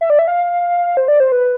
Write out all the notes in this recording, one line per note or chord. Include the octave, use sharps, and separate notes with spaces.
E5
D5
E5
F5
C5
D5
C5
B4